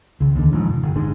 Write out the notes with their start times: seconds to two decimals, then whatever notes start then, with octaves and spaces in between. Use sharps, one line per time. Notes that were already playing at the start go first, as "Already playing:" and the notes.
0.20 C#2
0.35 D#2 D3
0.53 A1 G#2 F3
0.67 F1
0.83 G1
0.95 G1 G#2 G#3 D4